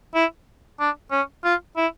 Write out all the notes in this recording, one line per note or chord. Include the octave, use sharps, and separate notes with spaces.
E4
D4
C#4
F4
E4